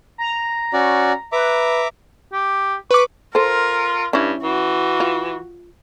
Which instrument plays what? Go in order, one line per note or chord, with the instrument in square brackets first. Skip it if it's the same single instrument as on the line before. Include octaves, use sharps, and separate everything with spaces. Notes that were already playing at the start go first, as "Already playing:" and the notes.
[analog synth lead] A#5
[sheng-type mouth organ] C#4 F#4 D5
[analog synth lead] B4 [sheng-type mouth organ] E5 A#5 D6
[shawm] G4
[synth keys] B4 D6 [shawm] C#6
[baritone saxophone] F4 [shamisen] A4 C5 [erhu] A#4
[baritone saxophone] G2 [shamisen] C#4 E4
[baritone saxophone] E3 [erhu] F#4
[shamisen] F4